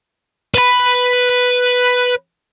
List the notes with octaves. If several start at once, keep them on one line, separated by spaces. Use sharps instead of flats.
B4 B5